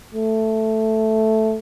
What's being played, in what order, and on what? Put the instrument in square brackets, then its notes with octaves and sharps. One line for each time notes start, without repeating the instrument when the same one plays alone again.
[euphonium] A3